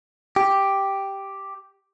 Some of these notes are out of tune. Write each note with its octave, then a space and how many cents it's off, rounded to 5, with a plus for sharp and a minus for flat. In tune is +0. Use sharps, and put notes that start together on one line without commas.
G4 +0